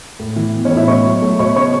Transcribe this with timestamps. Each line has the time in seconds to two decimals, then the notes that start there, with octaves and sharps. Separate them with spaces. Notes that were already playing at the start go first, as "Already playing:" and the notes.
0.20 A2
0.36 E3
0.54 B3
0.65 C#4 C#5
0.71 A2
0.76 E4 E5
0.88 B2 C#5 C#6
1.06 F#3
1.22 A3
1.39 B2 C#5 C#6
1.56 C#3 C#5 C#6